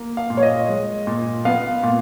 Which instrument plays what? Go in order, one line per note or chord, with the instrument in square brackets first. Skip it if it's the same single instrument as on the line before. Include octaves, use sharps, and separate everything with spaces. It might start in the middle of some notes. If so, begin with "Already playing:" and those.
Already playing: [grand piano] A#3
F5
A#2
C#5
D#5
G#3
A#2
B3 F5
A#2